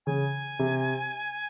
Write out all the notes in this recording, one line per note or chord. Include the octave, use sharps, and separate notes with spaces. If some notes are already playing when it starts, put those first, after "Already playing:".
C#3 G#5
C3